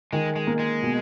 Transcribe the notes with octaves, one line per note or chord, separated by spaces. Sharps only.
D#3 G#3
G#3
A#3
G#3
B2